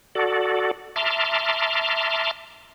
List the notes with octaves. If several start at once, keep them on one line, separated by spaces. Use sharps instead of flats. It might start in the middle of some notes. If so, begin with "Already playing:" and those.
F#4 A4 D5
E5 A5 A#5 C6 D6 F6